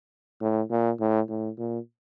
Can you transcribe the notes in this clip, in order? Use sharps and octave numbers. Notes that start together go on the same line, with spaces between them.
A2
A#2
A2
A2
A#2